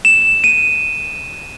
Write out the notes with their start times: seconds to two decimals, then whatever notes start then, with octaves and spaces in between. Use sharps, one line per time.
0.05 E7
0.44 D#7